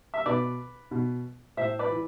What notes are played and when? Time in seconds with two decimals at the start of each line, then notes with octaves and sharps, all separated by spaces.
0.14 E5
0.26 B2 B4 D5
0.91 B2
1.57 A2 C5 E5
1.79 B4 D5
1.90 E3